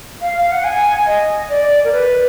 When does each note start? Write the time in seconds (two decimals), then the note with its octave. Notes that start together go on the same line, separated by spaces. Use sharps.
0.22 F5
0.39 F5
0.52 F#5
0.64 G#5
1.06 D#5
1.49 D5
1.84 A#4
1.92 B4